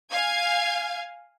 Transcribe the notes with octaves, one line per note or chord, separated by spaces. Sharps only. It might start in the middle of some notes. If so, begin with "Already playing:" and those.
F5 G#5 G#6